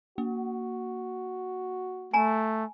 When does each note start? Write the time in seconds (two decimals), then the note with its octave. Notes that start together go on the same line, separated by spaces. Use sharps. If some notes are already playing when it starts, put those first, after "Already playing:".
0.18 A#3 F#4
2.14 A3 G#5 A#5